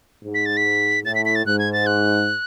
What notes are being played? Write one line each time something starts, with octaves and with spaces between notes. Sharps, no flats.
G#2
B6
A6
B6
A2 A6
B6
B6
A6
G#2 F#6
G#6
A6
F#6